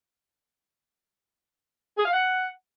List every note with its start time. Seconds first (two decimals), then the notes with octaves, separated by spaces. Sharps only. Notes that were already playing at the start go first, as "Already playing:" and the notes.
1.98 G#4
2.06 F5
2.13 F#5